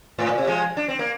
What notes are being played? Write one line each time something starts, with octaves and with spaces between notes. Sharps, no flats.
G#2
A#2
C3
F3 G#3
D4
C4
A#3